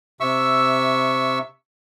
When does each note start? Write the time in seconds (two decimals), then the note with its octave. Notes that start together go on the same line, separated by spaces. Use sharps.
0.20 C3 E5 C#6 E6